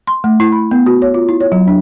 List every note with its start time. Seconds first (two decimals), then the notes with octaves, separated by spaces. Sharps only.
0.07 C6
0.24 A3
0.40 E4
0.52 B5
0.71 B3
0.86 F#4
1.02 C#5
1.14 F4
1.29 E4
1.41 C#5
1.52 F#3
1.68 D4